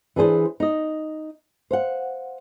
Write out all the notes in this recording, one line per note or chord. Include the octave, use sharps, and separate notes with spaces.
E3 D4 G#4 C5
D#4 D#5
C5 F5 F#5